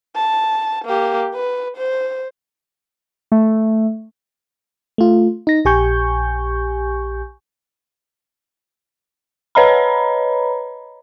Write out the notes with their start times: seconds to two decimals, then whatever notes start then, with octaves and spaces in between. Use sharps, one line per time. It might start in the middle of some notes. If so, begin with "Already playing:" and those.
0.16 A5
0.85 A#3 G4
1.34 B4
1.77 C5
3.32 A3
4.98 A3 F4
5.47 D#4 A#6
5.65 A#1 G4 G#5 C#6 G6
9.55 B4 C#5 D#5 A#5 B5